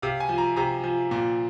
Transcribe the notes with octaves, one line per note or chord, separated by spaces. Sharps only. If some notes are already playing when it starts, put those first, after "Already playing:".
C3 F5
G#5
F3
A#5
C3 A#5
F3
A#2